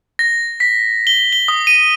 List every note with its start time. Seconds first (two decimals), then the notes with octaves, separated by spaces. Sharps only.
0.19 A#6
0.60 B6
1.07 G7
1.33 G7
1.48 D#6
1.67 D#7